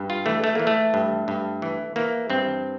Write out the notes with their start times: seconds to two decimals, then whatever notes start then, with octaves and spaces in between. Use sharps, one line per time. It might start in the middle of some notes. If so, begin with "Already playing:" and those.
Already playing: G2
0.10 F4
0.26 E3 A3
0.44 A3
0.55 E3 A#3
0.67 A3
0.94 G2
1.28 G2
1.62 E3
1.96 E3 A#3
2.30 G2 C4